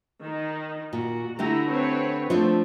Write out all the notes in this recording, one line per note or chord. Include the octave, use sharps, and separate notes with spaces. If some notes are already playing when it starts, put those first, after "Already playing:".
D#3 D#4
A#2 F#4
D3 A3 E4 G4 A4 A#5
C4 B4 C#5
F3 A3 C4 D4 F4